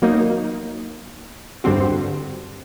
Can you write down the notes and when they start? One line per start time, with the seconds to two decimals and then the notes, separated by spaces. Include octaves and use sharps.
0.02 F#3 A#3 D#4
1.64 G2 D3 G3 C4 F#4